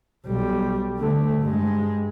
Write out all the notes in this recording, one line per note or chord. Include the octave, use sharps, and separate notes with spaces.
B1 G3
D3 A3
G2 G#3